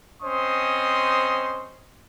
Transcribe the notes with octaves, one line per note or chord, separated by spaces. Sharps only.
C4 C#4 C5 D#5 C6 D#6